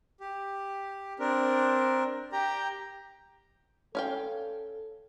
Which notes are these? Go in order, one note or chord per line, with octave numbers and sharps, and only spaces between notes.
G4
C4 D4 A#4
G4 G5 A#5
C#4 A4 F5 G5